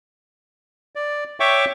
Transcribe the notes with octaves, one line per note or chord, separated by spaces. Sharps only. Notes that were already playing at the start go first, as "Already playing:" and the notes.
D5
C#5 E5 G5 C#6 D6